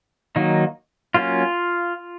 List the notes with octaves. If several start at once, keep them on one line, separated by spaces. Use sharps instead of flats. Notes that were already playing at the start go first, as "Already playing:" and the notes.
D#3 F#3 A#3 D#4
F#3 A#3 C#4 F4